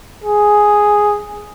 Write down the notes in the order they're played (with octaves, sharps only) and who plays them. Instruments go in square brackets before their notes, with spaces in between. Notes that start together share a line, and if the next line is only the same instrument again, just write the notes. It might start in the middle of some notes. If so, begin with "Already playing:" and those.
[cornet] G#4